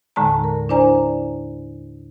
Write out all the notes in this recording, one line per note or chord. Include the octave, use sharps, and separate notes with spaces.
D#2 A2 D3 G#3 A5 A#5
A#4
D4 E4 C5 D5 G#5 A#5